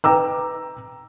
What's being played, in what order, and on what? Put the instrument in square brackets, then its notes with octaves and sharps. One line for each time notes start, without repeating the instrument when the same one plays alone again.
[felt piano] B4 G5 A#5 D6 E6